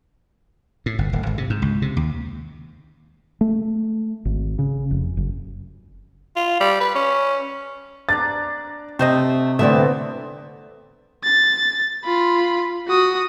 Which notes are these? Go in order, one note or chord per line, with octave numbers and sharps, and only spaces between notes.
A2
G1
D1
G#1
C3
G#2
C#2
C3
D#2
A3
G#1
C#3
F1
F#1
F4
G3
B4
C#4
D4 D5 A#5 A6
C3 A3 C5 D#5
D3 E3 A3 B3 C4 D5 E5
A6
F4 B5
F#4 D#6